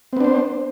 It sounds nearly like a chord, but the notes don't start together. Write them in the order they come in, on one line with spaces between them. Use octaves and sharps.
C4 B3 D4 C5